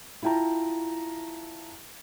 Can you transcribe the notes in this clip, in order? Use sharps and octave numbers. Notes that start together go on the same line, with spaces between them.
E4 F4 G5 A5 A#5